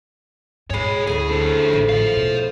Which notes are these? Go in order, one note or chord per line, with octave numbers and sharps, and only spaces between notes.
G#2 G#3 G#4 C#5 B5
D2 A2 C#3 A3 G#4
D3 C5
A1
C5 F5
B2